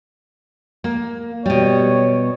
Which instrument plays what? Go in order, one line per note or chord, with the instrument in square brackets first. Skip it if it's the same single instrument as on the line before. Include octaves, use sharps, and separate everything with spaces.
[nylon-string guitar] A#3
[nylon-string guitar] B2 G3 [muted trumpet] C#5